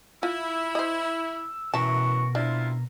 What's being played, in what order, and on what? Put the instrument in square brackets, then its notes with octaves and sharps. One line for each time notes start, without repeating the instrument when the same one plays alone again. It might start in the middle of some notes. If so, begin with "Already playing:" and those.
[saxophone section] E4 [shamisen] F4 [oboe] E6
[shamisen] C5 D#5
[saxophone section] F#2 E3 [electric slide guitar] B2 A#4 [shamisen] E5 A5 [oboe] C#6
[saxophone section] C3 E4 [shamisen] D4 [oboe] F4